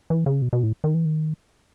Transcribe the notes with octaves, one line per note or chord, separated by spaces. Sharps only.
E3
C#3
B2
B2
A2
D#3
E3
D#3